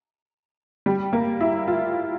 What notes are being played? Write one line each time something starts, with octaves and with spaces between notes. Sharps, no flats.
G3
A#3
E4
F4